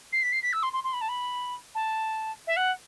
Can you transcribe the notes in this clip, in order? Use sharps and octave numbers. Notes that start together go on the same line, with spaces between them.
C7
B6
C7
B6
E6
C6
C6
C6
B5
A5
B5
A5
E5
F#5